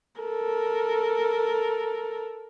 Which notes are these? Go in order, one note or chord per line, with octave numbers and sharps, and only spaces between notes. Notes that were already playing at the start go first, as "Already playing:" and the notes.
A4 A#4